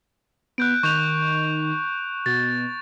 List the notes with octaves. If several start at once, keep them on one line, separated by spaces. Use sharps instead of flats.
B3 F#6 G6 D7
D#3 C#6 G6 F7
B2 A6